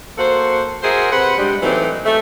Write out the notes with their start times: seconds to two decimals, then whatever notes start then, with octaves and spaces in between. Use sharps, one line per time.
0.18 A#3 F#4 A4 C5
0.83 F#4 G#4 A#4 C5 E5 F#5
1.12 C3 B4 C5 F#5
1.38 G3 G#3 D4
1.62 E3 F#3 A3 A#3 C4 D#4
2.05 A3